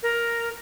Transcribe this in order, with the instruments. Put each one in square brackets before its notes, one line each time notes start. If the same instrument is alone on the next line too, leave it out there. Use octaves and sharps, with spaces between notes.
[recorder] A#4